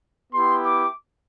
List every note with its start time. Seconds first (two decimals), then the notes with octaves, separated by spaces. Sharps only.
0.32 B3 E4 G4 C6
0.66 D6